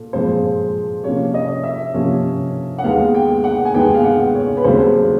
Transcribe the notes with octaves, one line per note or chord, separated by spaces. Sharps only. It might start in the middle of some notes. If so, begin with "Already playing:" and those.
Already playing: A#2 A4
A#2 F3 G#3 C4 C5
C3 F3 A#3 C#4 C#5
D#5
E5
C3 F3 A#3 C#4
F#5
D#2 D#3 G#3 B3 F5
G5
F#5
G#5
D#2 D#3 G#3 B3 G5
F5
F#5
C#5
B4
D#2 C#3 F#3 A3 C4 C5